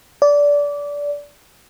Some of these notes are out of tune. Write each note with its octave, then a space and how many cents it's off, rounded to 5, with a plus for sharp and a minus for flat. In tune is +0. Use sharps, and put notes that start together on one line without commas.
D5 -20